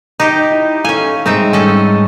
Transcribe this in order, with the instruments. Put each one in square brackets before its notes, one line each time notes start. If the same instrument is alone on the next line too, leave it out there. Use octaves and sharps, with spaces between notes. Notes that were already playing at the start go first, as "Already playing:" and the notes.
[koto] D#4 G4
[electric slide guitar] E4
[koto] C#4 G#5 [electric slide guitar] A4 D#5 F5
[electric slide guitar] G#2 G3 G#3 [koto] C4 D#4 E5
[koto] C#4 A4 D#5